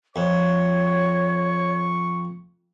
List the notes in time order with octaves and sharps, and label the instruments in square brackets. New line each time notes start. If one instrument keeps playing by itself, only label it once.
[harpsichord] F2 [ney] C#5 [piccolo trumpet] C#6